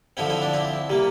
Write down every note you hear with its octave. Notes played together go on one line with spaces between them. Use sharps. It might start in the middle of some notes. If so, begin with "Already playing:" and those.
D3 F3 C4 E4
C4 E4
D4
C4 E4
C3 G3 A#3